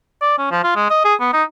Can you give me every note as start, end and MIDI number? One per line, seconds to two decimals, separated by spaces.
0.22 0.36 74
0.38 0.50 61
0.51 0.60 53
0.64 0.73 65
0.76 0.88 56
0.90 1.00 75
1.04 1.14 68
1.21 1.29 59
1.33 1.43 63